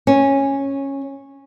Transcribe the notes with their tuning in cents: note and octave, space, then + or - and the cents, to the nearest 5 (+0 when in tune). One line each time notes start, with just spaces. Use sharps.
C#4 -10